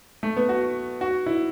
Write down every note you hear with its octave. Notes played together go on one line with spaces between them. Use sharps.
A3
B3
F#4
F#4
E4